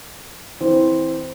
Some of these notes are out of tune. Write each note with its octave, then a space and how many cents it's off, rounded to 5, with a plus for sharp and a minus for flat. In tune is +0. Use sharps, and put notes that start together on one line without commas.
E3 -15 C4 +0